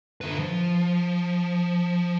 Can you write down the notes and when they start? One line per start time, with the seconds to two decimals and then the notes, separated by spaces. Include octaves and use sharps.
0.21 D3 B4
0.39 F3